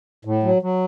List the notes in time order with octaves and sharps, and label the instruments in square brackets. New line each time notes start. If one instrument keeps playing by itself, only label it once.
[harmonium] A2
F#3
F#3